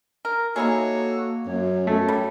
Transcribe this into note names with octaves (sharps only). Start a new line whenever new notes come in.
A#4
A#3 D#4 E4 F#4 G#4 A4 C#5
F#2 C#5
A3
G3